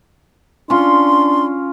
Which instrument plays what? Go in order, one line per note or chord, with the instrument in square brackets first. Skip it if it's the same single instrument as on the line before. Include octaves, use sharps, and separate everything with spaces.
[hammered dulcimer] C#4 F4 [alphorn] D4 [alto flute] C6